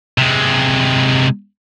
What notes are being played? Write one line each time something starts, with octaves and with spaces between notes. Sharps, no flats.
C3 G#3